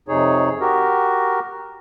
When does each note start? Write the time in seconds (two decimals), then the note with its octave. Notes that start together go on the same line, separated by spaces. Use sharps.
0.08 F2 C3 D#4 G#4 C#5
0.61 F#4 G4 A#4